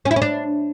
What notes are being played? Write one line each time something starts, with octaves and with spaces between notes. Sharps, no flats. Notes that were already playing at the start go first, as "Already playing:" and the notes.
C#4
E4
C#4
D4